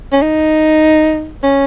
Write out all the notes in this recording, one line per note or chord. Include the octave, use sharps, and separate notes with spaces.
C#4
D#4
C#4